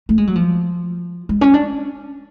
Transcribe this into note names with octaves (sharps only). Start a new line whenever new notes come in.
A3
G#3
F#3
F3
G#3
C#4
D4